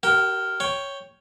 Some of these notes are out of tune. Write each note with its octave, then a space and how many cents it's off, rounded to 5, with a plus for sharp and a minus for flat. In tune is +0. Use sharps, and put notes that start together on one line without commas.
G4 -45 A#4 +0 G5 +0
C#5 +0 G5 +0